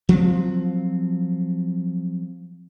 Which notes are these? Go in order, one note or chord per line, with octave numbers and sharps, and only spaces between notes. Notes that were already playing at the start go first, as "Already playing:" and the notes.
F3 F#3 A#3 C4